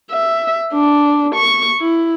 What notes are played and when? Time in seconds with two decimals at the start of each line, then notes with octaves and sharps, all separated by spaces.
0.10 E5
0.73 D4
1.35 C#6
1.80 E4